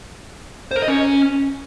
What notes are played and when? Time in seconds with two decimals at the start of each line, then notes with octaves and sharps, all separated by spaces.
0.71 C5
0.77 A#4
0.82 D#5
0.88 C#4